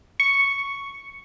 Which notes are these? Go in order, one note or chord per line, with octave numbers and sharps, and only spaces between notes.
C#6